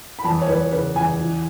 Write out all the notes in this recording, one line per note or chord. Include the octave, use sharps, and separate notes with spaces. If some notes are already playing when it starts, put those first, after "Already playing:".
B5
E2 A5
C#5
E2 B4
C#3 B4
E2 G#5
E3